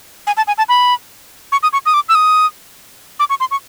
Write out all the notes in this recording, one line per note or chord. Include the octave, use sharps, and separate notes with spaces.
G#5
A5
G#5
A5
B5
C#6
D#6
C#6
D#6
D6
E6
D#6
D6
C#6
C6
C#6